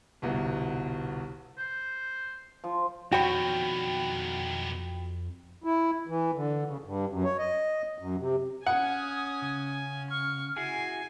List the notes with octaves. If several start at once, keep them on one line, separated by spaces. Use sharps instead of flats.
G1 C2 B2
C5
F3
F2 B2 D#3 F#4 C#5 G5 B5
E4
E3
D3
C#3
G2
F#2
C#5
D#5
F#2
C3
C#4 F#5 G#5 D#6
C#3
C#6 F6
E4 F#4 G#4 G#5 C7